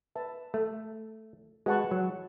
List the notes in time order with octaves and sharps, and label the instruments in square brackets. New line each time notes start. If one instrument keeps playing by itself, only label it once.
[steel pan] B4 E5 A5
[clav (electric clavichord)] A3
[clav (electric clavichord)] G#3 [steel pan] F#4 B4 F#5 A5 C#6
[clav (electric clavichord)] F#3